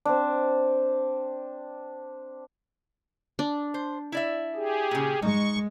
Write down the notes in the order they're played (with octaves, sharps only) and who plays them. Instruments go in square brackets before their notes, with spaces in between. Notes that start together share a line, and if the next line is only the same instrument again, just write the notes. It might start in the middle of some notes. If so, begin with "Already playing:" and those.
[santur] C4 D4
[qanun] D4
[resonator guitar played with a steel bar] C5
E4 D5 E5
[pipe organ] G4 G#4
[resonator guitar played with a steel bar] A#2 C#3
[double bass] G#3 [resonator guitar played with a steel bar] D#4 [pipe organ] C#6